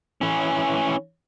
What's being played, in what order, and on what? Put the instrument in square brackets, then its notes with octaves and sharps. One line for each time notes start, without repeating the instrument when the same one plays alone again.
[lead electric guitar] E3 C#4